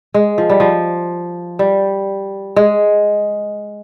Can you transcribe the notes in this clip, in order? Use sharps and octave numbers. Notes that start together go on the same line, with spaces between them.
G#3
F3
G3
F3
G3
G#3